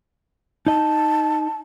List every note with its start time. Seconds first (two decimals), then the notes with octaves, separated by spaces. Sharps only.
0.66 D#4 D#5 A5